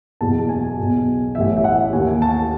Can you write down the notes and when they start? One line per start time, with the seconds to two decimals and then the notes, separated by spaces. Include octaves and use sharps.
0.21 F#1 E2 B2 A5
0.49 G#5
0.78 B1 B2
1.35 A1 A2 E3 E5
1.57 E5
1.64 F#5
1.93 D#2 D#3 G#5
2.22 A5